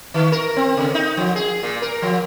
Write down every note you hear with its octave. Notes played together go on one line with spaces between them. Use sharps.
D#3
A#4
C4
C#3
D#4
F3
G#4
A#2
A#4
F3